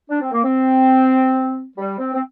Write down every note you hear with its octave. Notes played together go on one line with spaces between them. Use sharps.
D4
C4
A#3
C4
G3
C4
C4